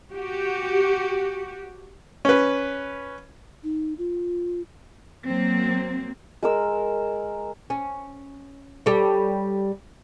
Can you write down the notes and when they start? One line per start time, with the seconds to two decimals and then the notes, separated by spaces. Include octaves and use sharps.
0.13 F#4 G4
2.25 C#4 B4
3.63 D#4
3.98 F4
5.26 F#3 A#3 C4
6.43 G#3 A#4 E6
7.70 C#4
8.86 G3 A4 C#5